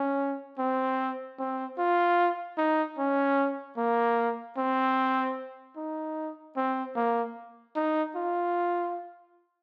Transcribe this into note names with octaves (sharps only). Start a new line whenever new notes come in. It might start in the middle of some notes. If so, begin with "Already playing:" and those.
Already playing: C#4
C4
C4
F4
D#4
C#4
A#3
C4
D#4
C4
A#3
D#4
F4